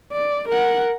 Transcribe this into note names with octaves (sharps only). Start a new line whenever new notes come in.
D5
A#4 F#5